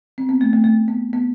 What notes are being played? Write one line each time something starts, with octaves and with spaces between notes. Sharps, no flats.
C4
B3
A3
A3
A3
B3
B3